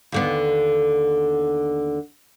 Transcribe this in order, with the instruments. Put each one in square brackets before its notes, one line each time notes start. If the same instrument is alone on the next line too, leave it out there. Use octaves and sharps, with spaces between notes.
[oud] D#2 D3 B3